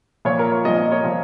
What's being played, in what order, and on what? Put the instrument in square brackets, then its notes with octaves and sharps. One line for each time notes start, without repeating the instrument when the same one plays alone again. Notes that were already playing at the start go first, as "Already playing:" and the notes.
[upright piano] A#2 F3 C#5
A#4
C#5
A#2 F3 D#5
D#5
C#5
A#2 F3